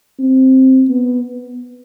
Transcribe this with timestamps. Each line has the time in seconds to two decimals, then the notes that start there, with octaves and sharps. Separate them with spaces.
0.19 C4
0.89 B3